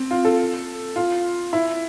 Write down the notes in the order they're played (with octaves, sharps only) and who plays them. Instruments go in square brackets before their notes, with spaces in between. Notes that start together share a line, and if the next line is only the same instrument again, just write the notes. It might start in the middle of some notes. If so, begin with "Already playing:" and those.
Already playing: [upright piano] C4
F4
A4
F4
E4